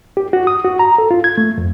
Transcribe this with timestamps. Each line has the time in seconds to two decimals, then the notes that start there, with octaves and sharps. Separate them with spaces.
0.17 G4
0.33 F#4
0.47 D#6
0.64 F#4
0.79 A#5
0.98 A4
1.11 F4
1.24 G#6
1.38 A3
1.58 F2